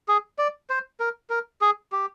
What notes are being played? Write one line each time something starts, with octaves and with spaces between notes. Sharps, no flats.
G#4
D5
C5
A#4
A#4
G#4
G4